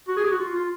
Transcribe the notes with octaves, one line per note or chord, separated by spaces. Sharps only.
F#4
G#4
G4
F#4
F4
F4